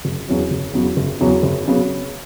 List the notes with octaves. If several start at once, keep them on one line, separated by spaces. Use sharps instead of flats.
F#1
E2 C#3 F#3 B3
F#1
E2 C#3 F#3 B3
F#1
E2 C#3 F#3 B3
F#1
C#3 F#3 B3